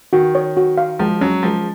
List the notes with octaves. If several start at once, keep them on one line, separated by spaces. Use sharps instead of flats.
D#3 F#4
C#5
F#4
F5
F3 G#3
F#3 C#4
F3 G#3